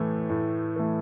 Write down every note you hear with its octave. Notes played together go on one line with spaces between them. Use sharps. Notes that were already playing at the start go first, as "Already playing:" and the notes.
Already playing: A2 E3 A3
A2
E3 A3